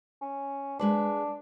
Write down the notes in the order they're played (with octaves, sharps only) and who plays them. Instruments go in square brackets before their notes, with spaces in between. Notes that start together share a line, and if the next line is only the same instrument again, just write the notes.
[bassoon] C#4
[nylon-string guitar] G#3 B4 C5 [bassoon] D4